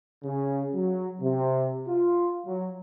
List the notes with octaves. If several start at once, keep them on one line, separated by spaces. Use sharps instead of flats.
C#3
F#3
C3
F4
F#3